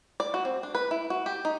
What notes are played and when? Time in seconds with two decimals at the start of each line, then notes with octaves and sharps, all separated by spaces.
0.20 D5
0.34 F#4
0.45 C4
0.63 D4
0.75 B4
0.91 E4
1.10 F#4
1.26 G4
1.45 D#4